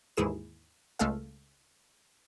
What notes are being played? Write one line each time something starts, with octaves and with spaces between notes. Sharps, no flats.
D#2 G#2 E3 E4 G#4 E7
C#2 G#3 A3 G#4 A4 F5